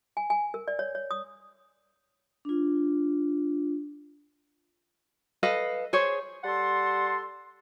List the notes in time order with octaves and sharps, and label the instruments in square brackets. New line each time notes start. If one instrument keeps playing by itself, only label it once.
[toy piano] G#5
G#5
A#4
D5
C#5
C#5
D#6
[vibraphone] D4 F4
[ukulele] A4 B4 D#5 F5
G#4 C5 C#5
[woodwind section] G3 A4 F#5 A5 C6